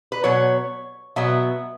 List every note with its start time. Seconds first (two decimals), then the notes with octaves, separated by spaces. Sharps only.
0.12 B4
0.23 B2 F#3 B3 C#5
1.16 B2 F#3 B3 E5